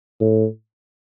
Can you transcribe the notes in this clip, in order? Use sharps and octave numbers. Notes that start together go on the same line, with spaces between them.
A2